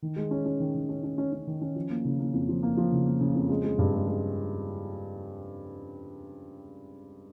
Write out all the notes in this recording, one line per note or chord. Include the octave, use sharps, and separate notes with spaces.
D#3
G#3
C#4
C#4
D#3
D#3
C#4
C#4
C#4
C#4
D#3
C#4
F3
A#3
C#3
A#3
F2
F3
A#3
F3
C#3
A#3
C#3
F2
G#3
G#3
G2
G#3
G#3